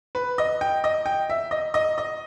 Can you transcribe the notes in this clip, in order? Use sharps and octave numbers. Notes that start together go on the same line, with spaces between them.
B4
D#5
G5
D#5
G5
E5
D#5
D#5
D#5